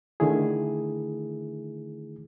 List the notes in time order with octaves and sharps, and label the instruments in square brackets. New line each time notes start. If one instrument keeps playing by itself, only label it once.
[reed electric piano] D3 D#3 A3 E4 G#4